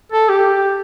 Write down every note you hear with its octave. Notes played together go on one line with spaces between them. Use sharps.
A4
G4